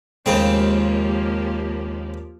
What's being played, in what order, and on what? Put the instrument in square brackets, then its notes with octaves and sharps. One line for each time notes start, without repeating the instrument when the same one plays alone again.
[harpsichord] D#2 C#3 C4 [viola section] F3 A#3 G4 [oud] G#3 F5